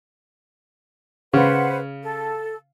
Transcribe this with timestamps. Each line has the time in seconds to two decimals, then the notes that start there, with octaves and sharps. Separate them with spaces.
1.34 C#3 B4 C5 F#5
2.02 A4